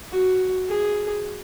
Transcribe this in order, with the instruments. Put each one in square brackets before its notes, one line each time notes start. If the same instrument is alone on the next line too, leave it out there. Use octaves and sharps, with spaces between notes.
[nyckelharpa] F#4
G#4